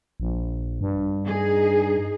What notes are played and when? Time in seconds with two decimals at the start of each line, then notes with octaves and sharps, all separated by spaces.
0.20 A#1
0.81 G2
1.26 D#4 G#4